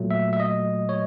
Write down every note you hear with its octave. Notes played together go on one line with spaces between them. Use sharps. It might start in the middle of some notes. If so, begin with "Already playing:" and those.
Already playing: A#2 F#3 A3
E5
E5
D#5
C#5